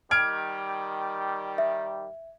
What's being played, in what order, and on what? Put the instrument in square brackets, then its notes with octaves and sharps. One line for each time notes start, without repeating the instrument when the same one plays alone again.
[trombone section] D#3 G3 [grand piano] F6 G#6 D7
[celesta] E5